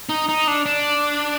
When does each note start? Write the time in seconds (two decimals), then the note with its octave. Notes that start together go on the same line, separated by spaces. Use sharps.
0.09 D#4
0.29 D#4
0.47 D4
0.66 D4